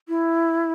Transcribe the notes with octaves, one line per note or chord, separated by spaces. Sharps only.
E4